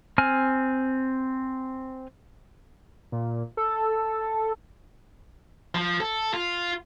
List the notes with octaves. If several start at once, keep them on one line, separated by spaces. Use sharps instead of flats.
C4 G#5 F6
A#2
A4
F3
A4
F4